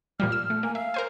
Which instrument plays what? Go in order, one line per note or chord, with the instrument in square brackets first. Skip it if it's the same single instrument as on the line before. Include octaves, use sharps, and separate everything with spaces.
[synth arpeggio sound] A#2 F3 G3 [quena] F6
[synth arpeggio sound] E6
A3
[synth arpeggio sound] A#3 [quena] G#5
[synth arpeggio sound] E5 [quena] F5
[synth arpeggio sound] A#4 C5 G#5